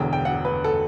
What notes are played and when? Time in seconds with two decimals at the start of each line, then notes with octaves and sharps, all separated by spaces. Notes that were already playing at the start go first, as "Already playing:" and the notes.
Already playing: E1 E2 D3 G5
0.13 G5
0.25 F#5
0.45 B4
0.64 A4